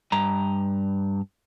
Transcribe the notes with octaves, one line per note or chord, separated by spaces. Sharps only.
G2 A#5